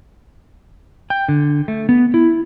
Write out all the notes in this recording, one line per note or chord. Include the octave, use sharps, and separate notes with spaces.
G5
D3
A3
B3
E4